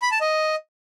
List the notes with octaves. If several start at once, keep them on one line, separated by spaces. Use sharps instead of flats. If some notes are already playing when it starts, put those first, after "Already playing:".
B5
A5
D#5